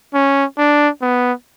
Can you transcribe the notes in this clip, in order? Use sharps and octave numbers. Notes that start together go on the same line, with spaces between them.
C#4
D4
B3